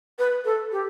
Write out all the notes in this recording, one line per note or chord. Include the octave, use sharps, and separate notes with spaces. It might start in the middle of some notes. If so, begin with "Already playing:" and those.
B4
A4
G4